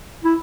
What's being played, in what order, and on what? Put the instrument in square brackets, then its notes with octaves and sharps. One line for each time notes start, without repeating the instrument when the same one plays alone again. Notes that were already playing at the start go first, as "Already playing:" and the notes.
[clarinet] E4